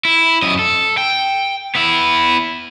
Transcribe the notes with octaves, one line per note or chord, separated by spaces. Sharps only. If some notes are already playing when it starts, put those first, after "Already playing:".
E4
F#2 D#5
A4
G5
B3 E4